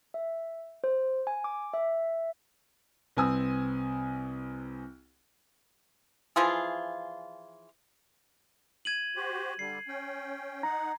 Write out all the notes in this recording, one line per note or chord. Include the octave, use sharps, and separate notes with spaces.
E5
C5
G#5
D6
E5
C2 C4 B4 G#5 D#6 E6
E3 F3 F4 G#4
G#6 D#7 F#7
F#4 G4 C5
D3 G3 C7
C#4 G5
D#4 F#5 A#5